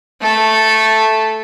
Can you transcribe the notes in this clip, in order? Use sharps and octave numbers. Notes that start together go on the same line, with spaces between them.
A3 A4